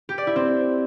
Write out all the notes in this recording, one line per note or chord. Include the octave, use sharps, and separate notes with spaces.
G4
D5
E4
C4